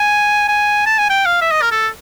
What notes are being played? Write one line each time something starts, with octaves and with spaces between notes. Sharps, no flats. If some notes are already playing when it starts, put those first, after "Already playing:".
Already playing: G#5
G#5
A5
G#5
G5
F5
E5
D#5
A#4
A4